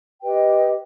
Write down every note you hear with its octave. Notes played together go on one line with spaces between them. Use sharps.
G4 B4 D#5 G5